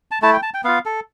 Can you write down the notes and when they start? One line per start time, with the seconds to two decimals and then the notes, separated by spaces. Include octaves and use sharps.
0.11 A5
0.22 A3 E4 A5
0.33 G5
0.43 A5
0.54 G5
0.64 B3 F4 F5
0.86 A4